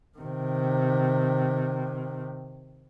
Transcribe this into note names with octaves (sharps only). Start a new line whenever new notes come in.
C3 D#3